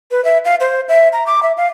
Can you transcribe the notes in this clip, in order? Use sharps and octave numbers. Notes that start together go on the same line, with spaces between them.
B4
E5
F5
C5
E5
A#5
D6
E5
F5